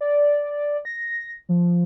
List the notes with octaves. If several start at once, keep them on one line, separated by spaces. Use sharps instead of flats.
D5
A#6
F3